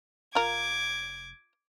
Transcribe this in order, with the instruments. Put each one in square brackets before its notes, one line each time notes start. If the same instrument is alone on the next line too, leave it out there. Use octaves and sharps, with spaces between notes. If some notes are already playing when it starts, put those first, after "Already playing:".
[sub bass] F1 [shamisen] F4 A#4 [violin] D6 G#6